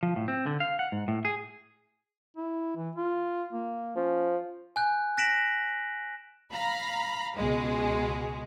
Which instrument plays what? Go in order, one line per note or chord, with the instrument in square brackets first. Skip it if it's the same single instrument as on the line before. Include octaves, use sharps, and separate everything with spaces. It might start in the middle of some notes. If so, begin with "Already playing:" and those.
[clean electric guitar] F3
A2
C4
D3
F5
F#5
G#2
A2
G#4
[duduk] E4
E3
F4
A#3
[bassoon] F3 [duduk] C#4
[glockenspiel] G#5 F#6 G6
F#6 A#6 B6 D7 E7 F#7
[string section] F5 A#5 B5
C#2 B2 G#3